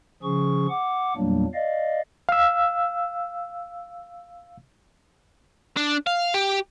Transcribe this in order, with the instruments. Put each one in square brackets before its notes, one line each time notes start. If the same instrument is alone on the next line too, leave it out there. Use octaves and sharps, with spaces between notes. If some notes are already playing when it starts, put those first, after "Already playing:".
[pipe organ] C#3 F3 C#4 G#4 C#6
F#5 D6
E2 A#2 F#3 G3 A#3 D4
D5 D#5 F5
[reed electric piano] F5 E6
[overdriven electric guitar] D4
F5
G4